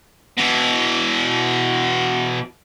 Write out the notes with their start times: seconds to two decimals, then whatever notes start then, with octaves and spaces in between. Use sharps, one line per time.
0.38 B2 E3